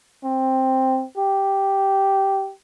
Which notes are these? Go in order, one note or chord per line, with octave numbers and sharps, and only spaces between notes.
C4
G4